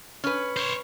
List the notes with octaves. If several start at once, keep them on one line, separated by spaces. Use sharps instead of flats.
C#4 B4
C5 C#5